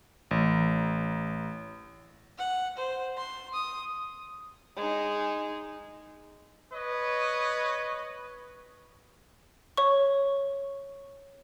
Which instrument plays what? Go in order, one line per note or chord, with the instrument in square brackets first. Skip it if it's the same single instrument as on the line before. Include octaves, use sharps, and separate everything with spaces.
[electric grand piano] A1
[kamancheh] F#5
C5
C6
D#6
[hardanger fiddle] G#3 D#4
[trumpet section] B4 C#5 D#5
[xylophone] C#5 C#6